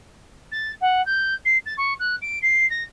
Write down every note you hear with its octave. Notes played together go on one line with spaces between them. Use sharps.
A6
F#5
G6
C7
A6
C#6
F#6
D7
C7
A#6